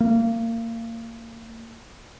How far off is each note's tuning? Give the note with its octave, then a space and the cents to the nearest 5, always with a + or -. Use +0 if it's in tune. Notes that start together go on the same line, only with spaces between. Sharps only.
A#3 -30